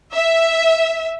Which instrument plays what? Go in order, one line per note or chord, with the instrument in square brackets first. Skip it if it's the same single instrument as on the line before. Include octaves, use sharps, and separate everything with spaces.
[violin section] E5